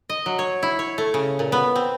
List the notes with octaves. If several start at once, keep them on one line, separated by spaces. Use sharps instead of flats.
D#5
F#3
C#5
E4
C#5
A3
C#3
A#2
B3
C4